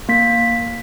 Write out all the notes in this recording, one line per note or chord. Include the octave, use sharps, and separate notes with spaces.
A#3 B6